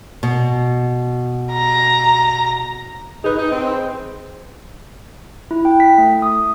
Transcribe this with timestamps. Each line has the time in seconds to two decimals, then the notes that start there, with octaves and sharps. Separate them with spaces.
0.23 B2
1.53 A#5
3.24 D#4 G#4 B4
3.38 D#4
3.52 C4
5.51 E4
5.65 G5
5.80 B6
5.98 A3
6.22 D#6